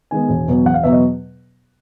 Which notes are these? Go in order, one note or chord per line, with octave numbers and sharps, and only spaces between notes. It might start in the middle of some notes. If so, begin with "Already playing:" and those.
D#3 G#3 B3 G#5
E1
E2 B2 F#3
E1 F#5
F5
E2 B2 F#3 E5
D#5